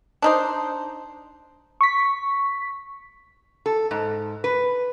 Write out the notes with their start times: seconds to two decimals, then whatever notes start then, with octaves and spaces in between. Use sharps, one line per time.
0.22 D4 D#4 C5
1.81 C#6 B6
3.66 A4
3.91 G#2
4.44 B4